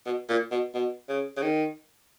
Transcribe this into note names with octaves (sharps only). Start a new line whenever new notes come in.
B2
A#2
B2
B2
C#3
C#3
D#3